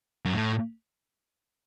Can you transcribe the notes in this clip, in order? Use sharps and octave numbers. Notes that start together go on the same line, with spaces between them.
F#2
A2